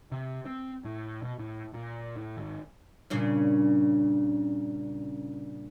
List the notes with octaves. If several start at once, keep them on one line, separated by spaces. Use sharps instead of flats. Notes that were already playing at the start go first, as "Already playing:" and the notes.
C3
C4
A2
B2
A2
A#2
A2
G#1
G2 A#2 C#3